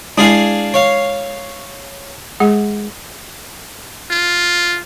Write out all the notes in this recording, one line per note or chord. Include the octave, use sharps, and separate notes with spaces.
G#3 D4 E4 G#4 F5 G#5
C#5 F5
G#3 G#4 F#5
F4